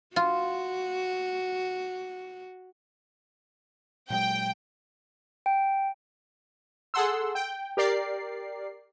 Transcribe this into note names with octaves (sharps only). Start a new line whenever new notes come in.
F4 F#4
A#2 F#3 G#3 G5
G5
G#4 A4 F#5 C6 E6
G5
G4 A#4 D5 C7